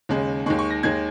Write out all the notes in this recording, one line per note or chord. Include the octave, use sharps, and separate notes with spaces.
D#2 C#3 G#3
D#2 D#3 G#3 C#6
C#6
A#6
D#2 D#3 G#3 G#6